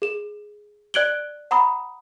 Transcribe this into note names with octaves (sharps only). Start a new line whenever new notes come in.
G#4 E7
D5 F#6 G#6 D7 F#7 G7
F#5 A#5 B5 D#6